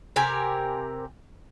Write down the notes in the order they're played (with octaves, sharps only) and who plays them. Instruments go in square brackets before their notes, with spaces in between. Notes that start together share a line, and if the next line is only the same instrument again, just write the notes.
[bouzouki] C3 G4 A#4 G#5